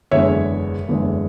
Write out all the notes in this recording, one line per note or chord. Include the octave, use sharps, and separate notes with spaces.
F#1 E2 D3 G#3 C#5 E5
F#1 E2 D3 G#3